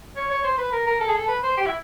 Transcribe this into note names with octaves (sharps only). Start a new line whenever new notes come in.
C#5
C#5
C5
B4
A#4
A#4
A4
G#4
A4
B4
C5
G4
E4